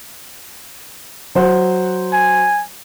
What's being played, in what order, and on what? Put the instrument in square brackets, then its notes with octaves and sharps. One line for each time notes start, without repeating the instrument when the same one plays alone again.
[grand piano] F#3 C5 F#5
[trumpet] G#5